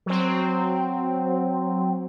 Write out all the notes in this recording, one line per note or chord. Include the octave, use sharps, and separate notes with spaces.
F#3 C4